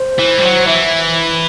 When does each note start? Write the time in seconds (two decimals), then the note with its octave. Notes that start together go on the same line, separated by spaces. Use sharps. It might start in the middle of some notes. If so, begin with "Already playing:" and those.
Already playing: C5
0.19 E3
0.38 G3
0.43 F#3
0.67 E3 E5